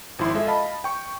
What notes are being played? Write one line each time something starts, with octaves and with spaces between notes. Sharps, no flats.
G#1 F3 E4 C6
G#3 F4 G#4 A4 E5
D#5 F5 A5 B5
G5 C#6